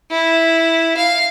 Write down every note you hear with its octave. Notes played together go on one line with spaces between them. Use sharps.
E4
F5